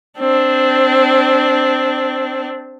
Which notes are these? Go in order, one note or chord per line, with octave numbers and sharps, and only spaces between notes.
C4 D4